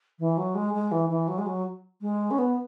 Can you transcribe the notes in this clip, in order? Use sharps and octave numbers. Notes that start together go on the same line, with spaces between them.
E3
F#3
G#3
G#3
E3
E3
F#3
G#3
F#3
G#3
C#4
B3